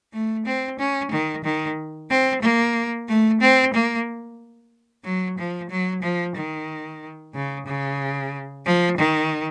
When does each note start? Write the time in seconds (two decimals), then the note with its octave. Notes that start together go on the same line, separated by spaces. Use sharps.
0.13 A3
0.46 C4
0.79 C#4
1.12 D#3
1.44 D#3
2.10 C4
2.42 A#3
3.08 A3
3.41 C4
3.74 A#3
5.05 F#3
5.38 F3
5.70 F#3
6.02 F3
6.36 D#3
7.34 C#3
7.67 C#3
8.66 F3
8.98 D#3